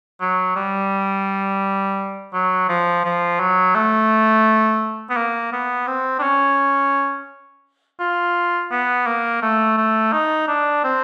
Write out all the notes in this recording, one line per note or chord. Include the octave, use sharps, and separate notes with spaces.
F#3
G3
F#3
F3
F3
F#3
A3
B3
A#3
B3
C4
D4
C#4
F4
B3
A#3
A3
A3
D#4
D4
C4